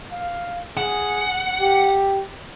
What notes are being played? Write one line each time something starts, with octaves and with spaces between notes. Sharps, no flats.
F5
G#4 F#5
G4